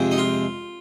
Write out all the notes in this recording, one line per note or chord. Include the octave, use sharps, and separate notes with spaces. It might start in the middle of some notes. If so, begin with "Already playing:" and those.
Already playing: F2 C3 F3 G#3 C4
D#4
F4